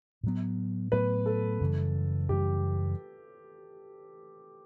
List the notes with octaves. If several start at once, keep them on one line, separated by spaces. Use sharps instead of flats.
A2 F#3 B3
A2 F#3 B3 B4
A4
F#2 C#3 E3 G3
F#2 C#3 E3 G3 G4